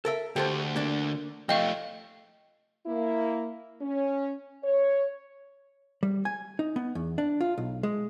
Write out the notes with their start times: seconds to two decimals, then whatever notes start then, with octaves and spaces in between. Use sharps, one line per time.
0.05 A4 A#4 E5
0.36 D2 G4 A4 C5
0.76 A#3 D4
1.49 F3 A3 D#5 F5 G5 C#6
2.86 A#3 E4
3.81 C#4
4.63 C#5
6.03 G3
6.25 G#5
6.59 D#4
6.76 B3
6.95 E2
7.18 D4
7.41 F4
7.58 B1
7.83 G#3